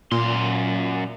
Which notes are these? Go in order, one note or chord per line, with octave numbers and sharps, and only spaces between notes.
F#2 A#2 C6